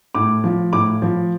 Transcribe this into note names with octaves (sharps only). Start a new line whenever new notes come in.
A2 D6
F3
A2 D6
F3